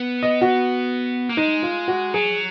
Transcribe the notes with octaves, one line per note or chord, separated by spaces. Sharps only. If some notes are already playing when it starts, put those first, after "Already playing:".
Already playing: B3
D#5
F#4
A#3
G#3 D#4
F4
F#4
F#3 G#4